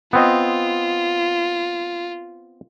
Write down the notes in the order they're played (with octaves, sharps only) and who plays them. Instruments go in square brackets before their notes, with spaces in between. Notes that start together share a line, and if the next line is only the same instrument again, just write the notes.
[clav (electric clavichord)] B3 C4 D#5 [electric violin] F4